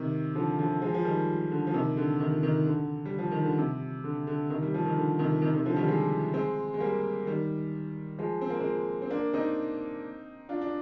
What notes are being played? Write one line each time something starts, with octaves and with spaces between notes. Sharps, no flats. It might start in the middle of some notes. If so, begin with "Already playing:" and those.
Already playing: C3 D#3
D3 F3
D3 F3
F3 G#3
F3
D#3 G3
D3
F3
C3 D#3
D3
C3 D#3
C3 D#3
D3
G3
F3
D#3
D3
C3
D3
D3
C3 D#3
G3
F3
D#3
D3
C3 D#3
C3 D#3
C3 D#3
D3 F3
D#3 G3
F3 G#3
G#3 C4
G#3
G3 A#3
D#3 G3
F3 G#3
C4
A#3
G#3 C4
C4
A#3 D4
C4 D#4
D4 F4
D4